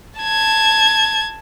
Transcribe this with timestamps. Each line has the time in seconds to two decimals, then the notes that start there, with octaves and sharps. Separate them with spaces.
0.20 A5 G#6